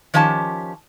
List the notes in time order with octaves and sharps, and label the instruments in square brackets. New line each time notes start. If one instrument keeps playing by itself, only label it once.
[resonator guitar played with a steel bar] D#3 F3 C#4 G4 A5